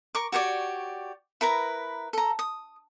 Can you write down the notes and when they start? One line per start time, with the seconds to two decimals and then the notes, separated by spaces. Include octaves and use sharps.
0.15 A#4 C#6 D6
0.32 F#4 G4 C#5 D5
1.41 E4 A#4 B4 A#5
2.13 A4 A#5
2.39 D#6